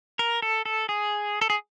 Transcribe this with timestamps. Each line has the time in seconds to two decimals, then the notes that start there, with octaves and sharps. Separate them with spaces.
0.19 A#4
0.42 A4
0.66 A4
0.89 G#4
1.41 A4
1.50 G#4